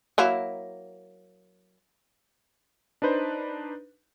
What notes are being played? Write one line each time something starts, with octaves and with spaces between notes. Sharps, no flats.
F#3 A#3 E4
D4 D#4 B4 C5